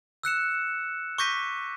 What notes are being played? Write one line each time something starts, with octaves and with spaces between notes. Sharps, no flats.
E6 F#6 C#7 E7
C#6 D6 G6 A#6 B6 D#7